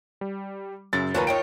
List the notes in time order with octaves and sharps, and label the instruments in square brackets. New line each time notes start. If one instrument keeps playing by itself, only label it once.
[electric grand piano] G3
[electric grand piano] F#2 C#3 [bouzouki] E4 [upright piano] A6
[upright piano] D#2 [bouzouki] F#3 C#4 B4 [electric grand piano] F4 A#4 A#5
[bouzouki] D#3 D#4 C#5 [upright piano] G5 D7